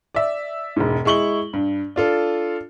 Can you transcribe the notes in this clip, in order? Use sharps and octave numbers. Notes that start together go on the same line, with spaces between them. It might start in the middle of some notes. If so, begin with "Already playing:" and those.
D5 E5
E1 G#2
G#3 E4 C#6 F#7 G7
G2
D4 F4 A4